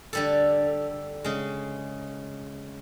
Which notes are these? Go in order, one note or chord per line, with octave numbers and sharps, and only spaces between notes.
D3 G3 A4
C#3 G#3